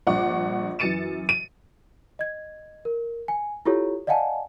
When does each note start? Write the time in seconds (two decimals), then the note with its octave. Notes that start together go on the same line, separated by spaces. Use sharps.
0.07 A#1 G2 F#5 C#6 D6
0.79 F#2 E3 A6 C#7 D#7 E7
1.29 D#7
2.19 D#5 G#6
2.85 A#4
3.28 G#5
3.65 E4 F4 G4 A4 C#5
4.07 D5 D#5 F5 F#5 G#5 A5